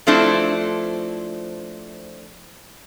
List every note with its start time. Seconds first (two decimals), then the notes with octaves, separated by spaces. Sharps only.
0.07 F3 A3 C4 D4 E4